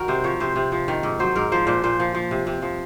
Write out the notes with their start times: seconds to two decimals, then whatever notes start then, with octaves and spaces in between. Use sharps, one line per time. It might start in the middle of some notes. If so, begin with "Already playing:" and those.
Already playing: D#3 F#4 A#4
0.08 C3 C5
0.24 F3 C#5
0.40 C3 C5
0.56 C3
0.72 F3
0.88 D#3
1.03 G#2
1.19 F#3 C5
1.36 G#2 A#4
1.52 F3 C5
1.67 A#2 C5
1.84 A#2 C5
2.00 F3
2.15 F3
2.31 C3
2.47 C3
2.62 F3